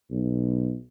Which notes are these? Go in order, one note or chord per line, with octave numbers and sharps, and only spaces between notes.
B1